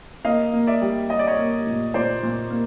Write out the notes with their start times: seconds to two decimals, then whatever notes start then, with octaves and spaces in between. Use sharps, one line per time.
0.25 A#3 D#5 F5
0.53 A#3
0.67 D5 E5
0.82 G3
1.10 G3 D#5
1.19 D5
1.27 C#5 D#5
1.38 A#3
1.67 A#2
1.94 A#2 C5 D5
2.23 A#2
2.50 A#3